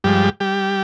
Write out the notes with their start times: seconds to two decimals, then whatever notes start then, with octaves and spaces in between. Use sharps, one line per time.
0.04 G2 F3 G3 G#3 G4
0.40 G3 G4